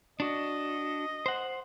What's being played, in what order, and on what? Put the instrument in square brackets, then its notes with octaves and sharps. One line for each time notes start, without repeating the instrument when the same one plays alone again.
[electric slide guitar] D4 F#4 [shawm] D#5
[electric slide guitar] C5 F#5